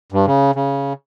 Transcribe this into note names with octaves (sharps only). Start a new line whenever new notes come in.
G2
C#3
C#3